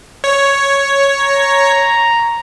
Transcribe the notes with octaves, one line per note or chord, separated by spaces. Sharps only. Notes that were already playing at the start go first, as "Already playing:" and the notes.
C#5
A#5